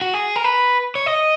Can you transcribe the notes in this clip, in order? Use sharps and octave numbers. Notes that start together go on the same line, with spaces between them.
F#4
G#4
A#4
B4
C#5
D#5